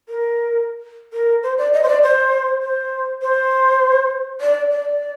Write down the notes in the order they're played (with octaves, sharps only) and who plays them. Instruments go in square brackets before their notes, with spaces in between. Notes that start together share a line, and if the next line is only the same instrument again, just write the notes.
[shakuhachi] A#4
A#4
C5
D5
D#5
C5
D5
C5
C5
C5
D5
D5